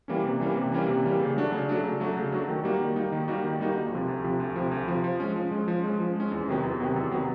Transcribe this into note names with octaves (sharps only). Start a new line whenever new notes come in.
E3 G3 A#3 C#4
C3
E3 G3 A#3 C#4
C3
E3 G3 A#3 C#4
C3
E3 G3 A#3 C#4
C#3
F#3 A3 D4 F#4
C#3
F#3 A3 D4 F#4
C#3
F#3 A3 D4 F#4
C#3
F#3 A3 D4 F#4
D#3
G3 A#3 D#4 F#4
D#3
G3 A#3 D#4 F#4
D#3
G3 A#3 D#4 F#4
D#3
G3 A#3 D#4 F#4
D2
C3 F3
D2
C3 F3
D2
C3 F3
D2
C3 F3
F3
G#3 C#4
F3
G#3 C#4
F3
G#3 C#4
F3
G#3 C#4
E2
C3 D#3 F#3 B3
E2
C3 D#3 F#3 B3
E2
C3 D#3 F#3 B3